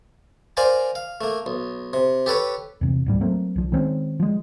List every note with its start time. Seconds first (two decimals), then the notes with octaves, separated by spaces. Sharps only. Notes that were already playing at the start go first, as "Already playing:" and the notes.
0.57 A#4 C5 D5 F5 G#5 A#5
0.95 F5
1.21 A3 A#3
1.46 B1
1.93 C3
2.26 G4 A4 B4 C#5
2.81 E2 C3
3.06 D1 G#2 G3
3.21 F#3 A3 A#3 C4
3.56 C2 F3
3.72 D#3 G#3 C4 C#4
4.20 F3 G#3